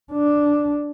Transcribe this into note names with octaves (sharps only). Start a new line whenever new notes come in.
D4